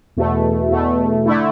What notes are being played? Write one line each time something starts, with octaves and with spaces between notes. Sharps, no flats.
E2 B2 A3
E2 B2 A3
D3 A3 E4